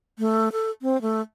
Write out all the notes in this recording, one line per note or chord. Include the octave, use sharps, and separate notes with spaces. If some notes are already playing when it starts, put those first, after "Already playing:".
A3
A4
C4
A3